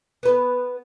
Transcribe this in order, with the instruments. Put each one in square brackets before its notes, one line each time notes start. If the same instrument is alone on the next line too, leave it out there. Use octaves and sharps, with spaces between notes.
[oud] B3 B4